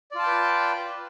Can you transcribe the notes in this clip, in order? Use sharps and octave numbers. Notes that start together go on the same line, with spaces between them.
F4 B4 D5 G5 A5